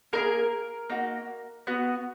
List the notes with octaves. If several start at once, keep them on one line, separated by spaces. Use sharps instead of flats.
A#3 D#4 G#4 A#4
A#3 D#4 F#4
B3 F#4